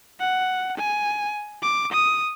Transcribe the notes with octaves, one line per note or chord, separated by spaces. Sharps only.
F#5
G#5
D6
D#6